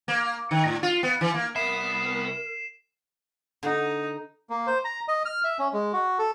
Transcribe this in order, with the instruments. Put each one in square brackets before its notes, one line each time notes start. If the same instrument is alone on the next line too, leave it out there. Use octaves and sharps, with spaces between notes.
[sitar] A#3
D#3
A2
F4
B3
E3
A#3
[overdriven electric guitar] C2 E5 [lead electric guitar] B3 [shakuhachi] A#4 [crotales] C7 E7
[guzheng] D3 [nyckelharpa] D#4
[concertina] A#3
C5
A#5
D#5
F6
E5
C#4
G#3
F#4
A4